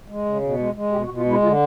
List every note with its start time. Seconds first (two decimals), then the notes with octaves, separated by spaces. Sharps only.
0.08 G#3
0.25 C#3
0.42 B2
0.59 G#3
0.75 G#3
0.92 B2 G4
1.05 F#4
1.09 B2
1.17 F4
1.25 G#3 E4
1.42 D3 F4